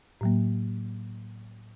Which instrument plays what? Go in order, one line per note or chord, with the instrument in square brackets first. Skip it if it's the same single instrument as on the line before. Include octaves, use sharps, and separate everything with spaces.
[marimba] A2 F#3 A#3